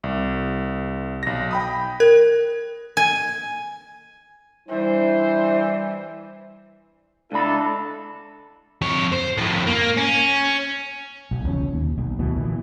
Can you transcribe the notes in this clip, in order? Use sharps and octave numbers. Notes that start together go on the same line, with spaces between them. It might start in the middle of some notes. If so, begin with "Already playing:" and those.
C2
B1 A#6
G5 B5 D#6
A#4 G#6
G#5
E3 G3 D4 E4 C5
C#2 D4 E4 A4 B5
F2 C#5
C5
F2 A2
A#3
C#4
B1
E1 C#2 C#4
D#2
B1
D2 B2 E3
A#2 E3